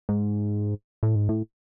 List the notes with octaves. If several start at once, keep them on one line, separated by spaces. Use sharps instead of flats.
G#2
A2
G#2
A2